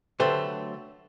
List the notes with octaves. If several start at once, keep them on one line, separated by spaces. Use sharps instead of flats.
D3 F#3 A3 G4 B4 C5